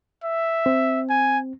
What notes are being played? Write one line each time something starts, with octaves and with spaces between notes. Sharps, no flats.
E5
C4
G#5